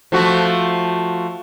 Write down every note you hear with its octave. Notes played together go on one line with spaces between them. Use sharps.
F3 A3 F#4